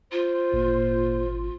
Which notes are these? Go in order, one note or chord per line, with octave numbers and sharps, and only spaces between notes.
F4 C5
G#1 A#2